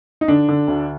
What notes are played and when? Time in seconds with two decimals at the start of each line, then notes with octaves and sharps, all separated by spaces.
0.21 D#4
0.28 D3 D4
0.48 D3
0.68 D2